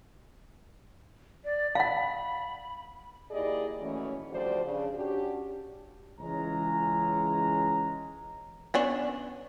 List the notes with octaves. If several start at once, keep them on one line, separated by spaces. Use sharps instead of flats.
D5
F5 F#5 B5
D#2 E4 G4 G#4 D5 D#5
D#2 E3 F#3 A3 C#4
D2 F3 G3 F#4 C5 D5
C#3 D4
C#4 D4 F#4 G4
C#2 E3 G#3 C#4 A#5
B3 C#4 D4